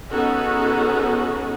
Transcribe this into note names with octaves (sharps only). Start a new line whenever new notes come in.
B3 C#4 D#4 F#4 G#4 A4